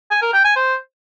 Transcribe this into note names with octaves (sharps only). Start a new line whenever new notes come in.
G#5
A#4
G5
G#5
C5